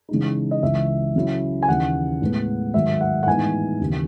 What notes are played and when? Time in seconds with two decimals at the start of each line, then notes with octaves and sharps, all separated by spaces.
0.09 C#3 E3 G#3 D#4
0.51 D#5
0.63 C#2 C#3 E3 E5
1.16 C#3 F#3 C#4 E4
1.62 G#5
1.68 D#2 C#3 E3 F#5
2.22 A2 G#3 B3
2.74 G#2 D#3 F#3 E5
3.01 F#5
3.23 F#5
3.27 A2 E3 G#3 B3 D#4 G#5
3.81 D#2 C#3 E3